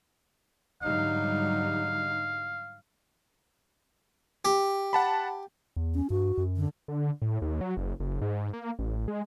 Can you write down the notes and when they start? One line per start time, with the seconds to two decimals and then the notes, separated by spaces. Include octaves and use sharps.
0.83 G#2 D3 F#3 G3 D#4 F5
4.45 G4
4.93 F#5 A5 B5
5.76 E2
5.95 C#4
6.10 G2 F#4
6.38 F#2
6.57 D3
6.88 D3
7.22 A2
7.42 D#2
7.61 F#3
7.77 F#1
8.00 F#1
8.21 G#2
8.53 A#3
8.79 A1
9.08 G#3